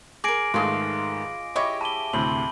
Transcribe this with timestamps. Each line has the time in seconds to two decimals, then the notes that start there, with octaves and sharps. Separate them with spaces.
0.24 G#4 A#4 D6 A#6 D7
0.54 G#2 D#3 A3 F4 G#4 B4 D#5 C6
1.56 E4 G4 C#5 D#5 D6
1.81 A5 B5 D#7 G7
2.13 D2 A2 C3 C4 B5 F#7